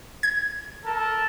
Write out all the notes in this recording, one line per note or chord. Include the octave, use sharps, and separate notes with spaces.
G#6
A4 A#4 A5